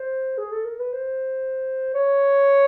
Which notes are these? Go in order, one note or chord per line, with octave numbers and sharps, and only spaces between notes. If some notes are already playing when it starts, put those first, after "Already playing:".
Already playing: C5
G#4
A4
A#4
B4
C5
C#5